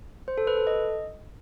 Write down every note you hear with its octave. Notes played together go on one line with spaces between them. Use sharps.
C5
A4
B4
A4
D#5